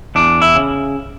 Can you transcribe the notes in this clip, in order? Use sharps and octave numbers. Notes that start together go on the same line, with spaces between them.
E2 D4
E4
C#3